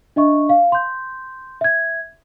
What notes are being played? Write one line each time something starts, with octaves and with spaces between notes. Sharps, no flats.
D4 D#5 E5 C#6
F5
C6 G6
E5 G#6